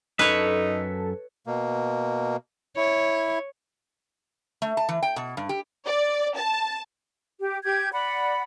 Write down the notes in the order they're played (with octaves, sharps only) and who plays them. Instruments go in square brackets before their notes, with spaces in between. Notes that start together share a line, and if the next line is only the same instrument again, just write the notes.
[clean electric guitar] F#2 E5 [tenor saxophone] D#4 [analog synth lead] A4 [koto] B4 C#5
[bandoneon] B2 A#3
[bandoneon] E4 [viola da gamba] C#5
[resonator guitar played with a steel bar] A3
A5
E3
G5
B2
G2
G4
[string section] D5
A5
[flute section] G4
G4 G6 G#6
D5 F#5 B5